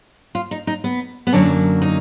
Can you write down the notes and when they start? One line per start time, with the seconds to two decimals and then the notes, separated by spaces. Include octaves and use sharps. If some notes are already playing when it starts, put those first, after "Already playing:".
0.35 F4
0.51 D#4
0.67 D#4
0.84 B3
1.27 B3
1.32 F#2 D3 F#3 A#3 D4
1.82 D#4